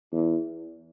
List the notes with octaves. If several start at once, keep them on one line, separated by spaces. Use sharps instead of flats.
E2